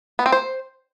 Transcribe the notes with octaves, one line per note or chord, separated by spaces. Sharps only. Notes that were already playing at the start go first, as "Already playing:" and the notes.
B3
C4
C5